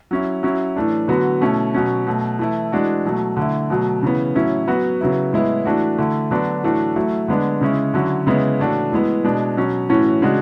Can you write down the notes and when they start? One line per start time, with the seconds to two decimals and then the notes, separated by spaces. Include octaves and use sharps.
0.11 F#3 C#4 E4
0.43 F#3 C#4 E4
0.76 A2 E3 A3 D4
1.08 D3 F#3 B3 F#4
1.41 B2 A3 C#4 E4
1.74 B2 F#3 C#4
2.07 B2 F#3 A3
2.39 E3 A3 E4
2.72 E3 G#3 D4 F#4
3.05 B2 F#3 A3
3.37 D3 A3 E4
3.70 B2 F#3 A3
4.03 C#3 E3 B3
4.35 A2 F#3 C#4 E4
4.68 F#3 B3 F#4
5.01 C#3 F#3 B3 E4
5.33 A2 G#3 B3 E4
5.65 E3 A3 D4 F#4
5.98 D3 A3 E4
6.31 D3 F#3 B3 D4 F#4
6.63 A2 E3 A3 D4 F#4
6.96 F#3 A3 E4
7.28 D3 G#3 B3 D4
7.61 C#3 G#3 C#4 E4
7.94 D3 F#3 C#4 E4
8.27 C#3 G#3 B3 E4
8.59 A2 E3 A3 D4 F#4
8.92 A2 E3 G#3 B3
9.24 B2 G#3 D4
9.57 B2 F#3 C#4
9.89 A2 E3 A3 C#4 F#4
10.22 C#3 G#3 D4 F#4